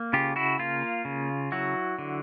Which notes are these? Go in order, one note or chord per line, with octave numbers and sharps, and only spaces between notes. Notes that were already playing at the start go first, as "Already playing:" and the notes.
Already playing: A#3
C#3 F4 G4
E4 F#4
A#3 F4
C#3
F#3 E4 F#4
D3